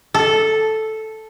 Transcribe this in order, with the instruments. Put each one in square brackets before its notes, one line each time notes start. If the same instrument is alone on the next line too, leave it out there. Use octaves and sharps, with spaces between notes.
[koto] A4